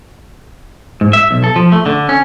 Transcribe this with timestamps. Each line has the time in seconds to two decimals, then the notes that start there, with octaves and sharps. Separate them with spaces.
1.01 G#2
1.13 E5
1.31 B1
1.44 A4
1.56 F3
1.72 A3
1.86 D3
2.09 C#4